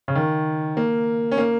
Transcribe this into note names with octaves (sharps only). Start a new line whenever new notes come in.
C#3
D#3
A#3
C#4
A#3